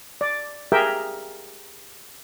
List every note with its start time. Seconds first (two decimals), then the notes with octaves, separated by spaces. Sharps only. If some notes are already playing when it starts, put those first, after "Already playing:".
0.21 D5
0.72 G4 G#4 A#4 E5 G5